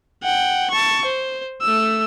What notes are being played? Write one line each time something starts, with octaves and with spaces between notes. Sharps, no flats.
F#5 G5
A5 C#6
C5
A3 E6